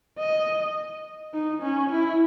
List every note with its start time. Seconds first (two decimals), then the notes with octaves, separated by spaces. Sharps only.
0.19 D#5
1.34 D#4
1.63 C#4
1.90 E4